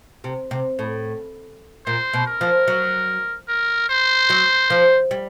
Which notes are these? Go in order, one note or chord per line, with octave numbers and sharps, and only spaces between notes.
C3
C3
A2
A#2 C5
B2
A#4
F3
F#3
A#4
C5
F#3
F3
G3